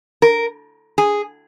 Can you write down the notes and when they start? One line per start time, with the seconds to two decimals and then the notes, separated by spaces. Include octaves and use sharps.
0.22 A#4
0.98 G#4